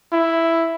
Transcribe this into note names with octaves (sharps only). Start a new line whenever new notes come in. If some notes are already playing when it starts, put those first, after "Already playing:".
E4